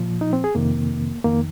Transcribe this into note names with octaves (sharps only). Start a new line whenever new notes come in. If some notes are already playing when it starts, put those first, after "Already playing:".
Already playing: A#2 F3
D#4
C4
G#4
F2 C3 D#3 A#3
F2 D#3 A#3